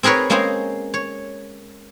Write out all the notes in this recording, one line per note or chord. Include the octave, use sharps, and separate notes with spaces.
C4 G#4 A#4 B4 C#5
G#3 A#3 C4 C#4 G#4 C5
C#5